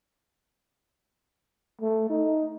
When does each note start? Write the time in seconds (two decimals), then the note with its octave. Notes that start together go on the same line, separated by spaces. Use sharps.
1.81 A3
2.10 D#4